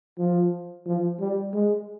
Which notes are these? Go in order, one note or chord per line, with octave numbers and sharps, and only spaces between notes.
F3
F3
G3
G#3